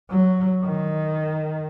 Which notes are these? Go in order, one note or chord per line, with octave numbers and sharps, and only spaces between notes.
F#3
D#3